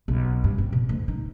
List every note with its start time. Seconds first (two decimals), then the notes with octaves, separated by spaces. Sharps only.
0.08 B1
0.44 G2
0.58 C4
0.73 B2
0.89 D2
1.08 D#4